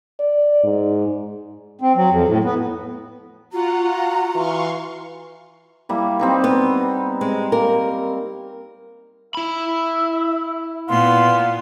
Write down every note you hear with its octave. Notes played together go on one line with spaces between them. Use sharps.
D5
G#2
C4
F#3
F2
A2
B3
F4 F#4 F#5 A#5
E3 F5 C6 C#6
G3 A#3 E4
C4 D#4 B4
B3
G#3 C4
A#3 A#4
E4 E5 B5
A#2 B3 F5 C6